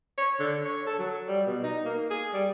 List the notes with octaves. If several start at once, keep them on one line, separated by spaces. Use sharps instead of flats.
C#5
D3
C#5
A4
F#3
G3
B2
D#4
A#3
G#4
G3